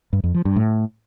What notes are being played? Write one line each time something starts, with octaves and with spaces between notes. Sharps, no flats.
G2
F2
F3
G2
A2